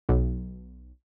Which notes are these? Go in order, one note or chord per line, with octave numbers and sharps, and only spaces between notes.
B1